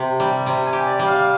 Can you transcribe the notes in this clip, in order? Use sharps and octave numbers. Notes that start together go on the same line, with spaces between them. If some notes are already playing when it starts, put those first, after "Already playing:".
Already playing: C3
G3
C3
G#5
G4
D5
G3
F5